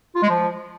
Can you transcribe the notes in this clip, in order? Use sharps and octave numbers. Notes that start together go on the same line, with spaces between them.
F4
G#3
F3